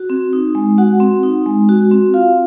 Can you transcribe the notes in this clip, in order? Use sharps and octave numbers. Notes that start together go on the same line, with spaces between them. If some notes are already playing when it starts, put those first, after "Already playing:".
Already playing: F#4
C4
D#4
G#3
F#4 F#5
C4
D#4
G#3
F#4
C4
F4 F5